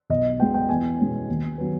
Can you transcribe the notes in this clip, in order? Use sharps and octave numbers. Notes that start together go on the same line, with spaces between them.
B1 D#5
B2 G#3 B3 G5
G5
E2 G#5
B2 G#3 C#4
D#2
D#3 F#3 B3